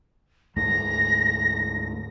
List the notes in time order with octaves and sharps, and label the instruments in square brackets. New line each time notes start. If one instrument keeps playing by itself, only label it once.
[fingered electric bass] D2 G#2 A3 [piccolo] A#6